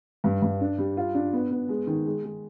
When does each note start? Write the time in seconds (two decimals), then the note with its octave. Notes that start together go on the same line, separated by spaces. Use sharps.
0.24 G2
0.42 G2
0.61 D4
0.78 G3
0.97 F4
1.15 D4
1.33 B3
1.51 B3
1.69 G#3
1.87 D#3
2.06 G#3
2.24 G#3